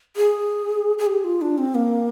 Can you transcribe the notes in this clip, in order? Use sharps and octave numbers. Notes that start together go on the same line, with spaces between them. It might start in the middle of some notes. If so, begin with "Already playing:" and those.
G#4
G#4
G4
F4
D4
C4
A#3